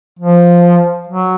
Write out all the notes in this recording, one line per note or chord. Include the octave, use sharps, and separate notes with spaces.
F3
F#3